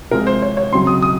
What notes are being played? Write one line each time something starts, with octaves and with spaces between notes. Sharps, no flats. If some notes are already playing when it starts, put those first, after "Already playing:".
C3 F3 G#3 A#4
C5
C#5
C#5
C#3 F#3 C4 C6
D#6
D#6